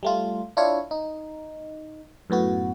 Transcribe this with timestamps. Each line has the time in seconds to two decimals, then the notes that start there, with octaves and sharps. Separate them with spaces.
0.03 G3 A3 F4
0.57 D4 E4 F4 C#5
0.91 D#4
2.30 F#2 A2 B3 F#4